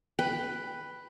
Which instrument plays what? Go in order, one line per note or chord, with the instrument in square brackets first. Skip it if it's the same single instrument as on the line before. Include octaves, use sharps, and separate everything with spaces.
[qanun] B4 G5